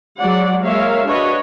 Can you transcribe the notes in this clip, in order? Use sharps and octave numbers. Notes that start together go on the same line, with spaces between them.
F#3 G#3 D5 F#5
G#3 A#3 A#4 C#5 E5 F5
D4 F#4 B4 C#5 D#5